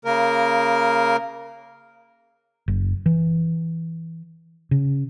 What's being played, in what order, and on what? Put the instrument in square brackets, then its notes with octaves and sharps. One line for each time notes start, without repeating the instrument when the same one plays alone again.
[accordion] C#3 A#3 A#4
[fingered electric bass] F#1
E3
C#3